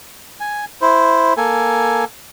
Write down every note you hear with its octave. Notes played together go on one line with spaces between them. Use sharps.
G#5
E4 C5
A#3 A4 G#5